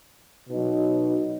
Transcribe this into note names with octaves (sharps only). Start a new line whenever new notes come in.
B2 F#3 D#4